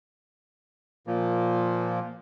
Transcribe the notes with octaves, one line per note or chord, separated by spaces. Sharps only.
A#2 F3 A#3